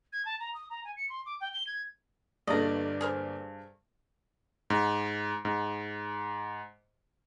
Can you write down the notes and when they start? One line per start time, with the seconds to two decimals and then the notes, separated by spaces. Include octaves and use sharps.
0.13 G#6
0.25 A5
0.40 A#5
0.54 D#6
0.70 A#5
0.84 G#5
0.96 C#7
1.09 C6
1.26 D6
1.41 G5
1.53 G7
1.67 G#6
2.47 G1 G2 A#3 A4 D5 D#5 A#5
3.01 G#4 A#4 C5
4.70 G#2
5.45 G#2